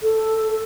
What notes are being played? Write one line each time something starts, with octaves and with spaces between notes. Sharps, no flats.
A4